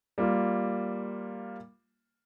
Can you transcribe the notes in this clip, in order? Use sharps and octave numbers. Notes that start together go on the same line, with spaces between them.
G3 A#3 F4